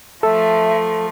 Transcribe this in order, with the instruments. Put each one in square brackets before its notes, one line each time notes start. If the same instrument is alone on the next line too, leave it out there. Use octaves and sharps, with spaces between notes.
[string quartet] F3 A3 [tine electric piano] A4 [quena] E5